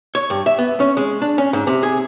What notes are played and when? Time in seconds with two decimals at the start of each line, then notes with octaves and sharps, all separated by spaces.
0.15 C#5
0.30 G2
0.46 E5
0.58 B3
0.80 C#4
0.97 G#3
1.22 D4
1.38 C#4
1.53 G#2
1.67 C3
1.83 G#4